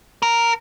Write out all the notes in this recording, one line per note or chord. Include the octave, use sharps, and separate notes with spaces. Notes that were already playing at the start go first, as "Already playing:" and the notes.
A#4